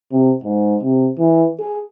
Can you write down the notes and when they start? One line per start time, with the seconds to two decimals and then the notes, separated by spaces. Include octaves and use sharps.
0.12 C3
0.44 G#2
0.83 C3
1.18 E3
1.59 G#4